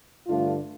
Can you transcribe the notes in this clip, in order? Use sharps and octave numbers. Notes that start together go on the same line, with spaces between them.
G2 D3 A3 D4 F4